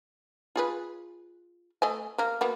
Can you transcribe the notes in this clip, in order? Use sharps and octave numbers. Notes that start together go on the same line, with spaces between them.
F4 G#4 B4
A3 D#5 G#5
A#3 A#4
A#3 B3 F#4